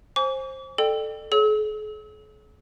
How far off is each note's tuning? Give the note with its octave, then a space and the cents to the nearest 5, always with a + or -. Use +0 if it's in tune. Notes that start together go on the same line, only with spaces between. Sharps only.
C5 +20 G#5 +0 D6 -45
A4 +0 D5 +40 G5 +0
G#4 +45 C#5 +5 E6 -40